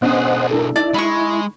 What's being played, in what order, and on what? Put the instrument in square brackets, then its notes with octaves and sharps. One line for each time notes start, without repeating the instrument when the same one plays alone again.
[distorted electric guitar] B1 G#4 [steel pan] B3 C#4 D4 [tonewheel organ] C5 D#5 F#5
[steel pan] D4 E4 A4 [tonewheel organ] A#4
[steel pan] D#4 A5 [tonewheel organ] E4 [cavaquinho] D5
[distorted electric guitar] G#3 [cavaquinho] B5 C#6